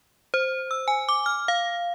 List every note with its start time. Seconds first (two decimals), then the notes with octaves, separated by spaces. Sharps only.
0.34 C5
0.71 E6
0.88 G#5
1.09 D6
1.26 F6
1.48 F5